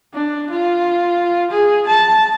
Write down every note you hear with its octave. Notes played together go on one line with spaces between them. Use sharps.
D4
F4
G#4
A5